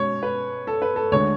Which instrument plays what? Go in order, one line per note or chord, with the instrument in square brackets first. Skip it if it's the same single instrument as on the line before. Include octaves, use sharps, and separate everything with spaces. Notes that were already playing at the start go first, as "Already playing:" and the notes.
Already playing: [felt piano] B2 G#3 C#4 [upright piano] C#5
[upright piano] B4
A4
B4
A4
[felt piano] D2 D3 G#3 [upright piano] C#5